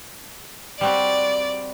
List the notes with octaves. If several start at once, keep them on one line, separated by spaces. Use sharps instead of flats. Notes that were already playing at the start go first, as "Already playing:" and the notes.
G3 C4 F#4 D5